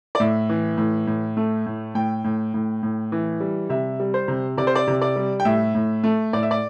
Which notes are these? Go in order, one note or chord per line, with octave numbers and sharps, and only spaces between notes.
D5
A2 E5
E3
A2
A2
A3
A2
A2 G5
A2
A2
A2
E3
G3
C3 E5
G3
C5
C3
C3 D5
C5
D5
C3
D5
G3
G5
A2 E5
A2
A3
A2 D5
E5
D5